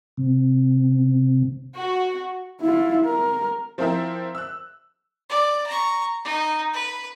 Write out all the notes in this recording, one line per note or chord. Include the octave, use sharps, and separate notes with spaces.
C3
F#4
E4 F4
A#4
F3 C4 E4 A#4 C5 E5
E6 F#6
D5
A#5 C#6
D#4
B4